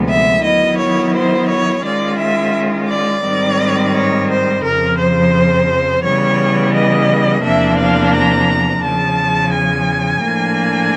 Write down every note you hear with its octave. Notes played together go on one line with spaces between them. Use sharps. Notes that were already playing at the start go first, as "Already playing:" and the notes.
Already playing: D2 C3 F3 G#3 B3
E5
D#3 F#3 B3 E4 D#5
C#5
C5
C#5
D#3 G#3 C#4 F4 D5
E5
D5
G#2 D#3 G3 C4 D#4
C#5
C5
F2 C#3 F3 A#4
C5
C#3 E3 G3 B3 C#5
D#5
E2 C3 F3 A#3 D4 E5
F5
A#5
E2 C#3 F3 A5
G#5
A2 F3 A#3 D4